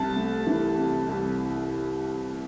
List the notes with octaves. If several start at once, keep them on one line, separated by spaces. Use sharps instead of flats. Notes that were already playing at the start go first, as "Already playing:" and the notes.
Already playing: C2 A5
A3
E3
C3
C2